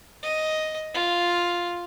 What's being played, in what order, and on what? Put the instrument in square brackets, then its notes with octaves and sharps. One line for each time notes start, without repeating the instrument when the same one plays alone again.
[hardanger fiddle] D#5
F4